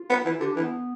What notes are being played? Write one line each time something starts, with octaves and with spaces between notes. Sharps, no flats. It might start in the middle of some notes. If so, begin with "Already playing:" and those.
Already playing: F4
B3
E3
F4
D3 G4
D4
E3
B3